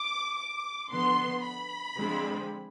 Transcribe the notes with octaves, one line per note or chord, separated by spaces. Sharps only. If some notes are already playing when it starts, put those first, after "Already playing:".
Already playing: D6
D6
D3 F3 B3 C6
B5
D3 F3 G#3 C4